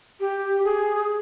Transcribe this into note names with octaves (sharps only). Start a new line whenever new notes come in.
G4
G#4